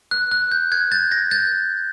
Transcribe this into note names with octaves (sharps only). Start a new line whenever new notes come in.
F#6
F#6
G6
F#6 G#6
G6 A6
G#6 A#6
G6 A6